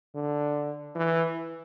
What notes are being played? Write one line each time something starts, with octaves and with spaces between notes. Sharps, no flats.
D3
E3